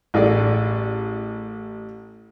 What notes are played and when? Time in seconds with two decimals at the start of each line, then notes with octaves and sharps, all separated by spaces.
0.14 A1 G#4 A4 D5